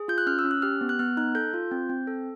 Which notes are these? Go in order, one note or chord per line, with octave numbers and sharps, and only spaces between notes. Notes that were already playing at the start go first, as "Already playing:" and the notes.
Already playing: G#4
F4 G6
F#6
C#4 F6
E6
C#4
F#6
G4 F6
B3
F#6
B3 F6
D#4 F#6
A4 G6
F4
C4
C4
A4